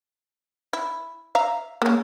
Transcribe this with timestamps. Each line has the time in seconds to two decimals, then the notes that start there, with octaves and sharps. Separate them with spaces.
0.73 E4
1.35 E5 F5 A#5
1.82 G#3 A#3 C#4